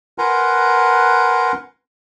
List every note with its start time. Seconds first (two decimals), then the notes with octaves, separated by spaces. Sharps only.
0.18 A#4 B4 F#5 G#5 A#5 C6